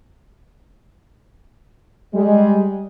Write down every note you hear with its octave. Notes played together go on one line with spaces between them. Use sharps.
G3 G#3